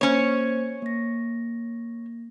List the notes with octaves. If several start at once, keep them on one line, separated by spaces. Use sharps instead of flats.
A#3 C#4 C5 C#5
A#3 A#6